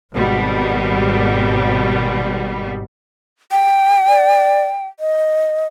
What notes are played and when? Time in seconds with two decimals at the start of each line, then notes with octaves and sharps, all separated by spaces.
0.13 G#1 B2 G3
3.51 G5
4.08 D5
5.00 D#5